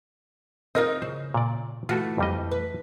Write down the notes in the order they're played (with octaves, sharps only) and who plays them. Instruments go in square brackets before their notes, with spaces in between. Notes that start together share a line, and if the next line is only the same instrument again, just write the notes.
[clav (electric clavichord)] C4 F4 [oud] D#4 A#4 D#5
[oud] C#3 [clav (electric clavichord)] C5
[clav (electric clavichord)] A#2 D5
[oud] E3 A3 [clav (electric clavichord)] F4 F#4 A4
[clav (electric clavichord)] F2 G3 D#5
[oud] B4